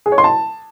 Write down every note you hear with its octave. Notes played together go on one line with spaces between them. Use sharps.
G#4
C#5
C6
A5